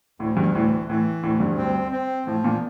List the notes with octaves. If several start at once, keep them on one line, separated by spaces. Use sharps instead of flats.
D2 A2
G2
A2 E3
A2 E3
D2 A2
G2
C4
C4
A2 F3
A#2